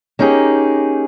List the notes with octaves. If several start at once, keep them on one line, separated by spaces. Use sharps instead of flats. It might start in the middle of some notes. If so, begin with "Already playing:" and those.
A#3 C#4 D#4 G4 G#4